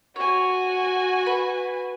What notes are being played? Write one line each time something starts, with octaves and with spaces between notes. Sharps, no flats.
F#4 C#5 G#5
B4